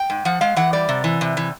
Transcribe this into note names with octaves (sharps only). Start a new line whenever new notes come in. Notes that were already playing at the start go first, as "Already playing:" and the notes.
Already playing: G5
G#2
F3 F#5
G#3 F5
E3 F#5
G3 D5
C3
E3
C3
E3